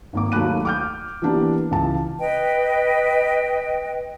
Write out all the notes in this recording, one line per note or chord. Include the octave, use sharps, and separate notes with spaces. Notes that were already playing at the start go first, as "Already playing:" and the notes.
G#1 A#3 D6
D#2 F#3 A3 B5 F#6 D#7
D6 F6 G6
E3 A#3 B3 D4 G4
C#2 E3 A5
B4 D#5 G5